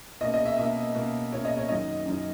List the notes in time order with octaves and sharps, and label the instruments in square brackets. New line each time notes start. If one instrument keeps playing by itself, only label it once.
[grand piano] B2 A#3 C#4 [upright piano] D#5
[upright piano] D#5
E5
[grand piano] B2 A#3 C#4 [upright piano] E5
[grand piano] B2 A#3 C#4
[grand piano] B2 A#3 C#4 [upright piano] C#5
[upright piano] D#5
C#5
[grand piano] F#2 D#3 F#3 C#4 [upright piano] D#5
[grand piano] F#2 D#3 F#3 C#4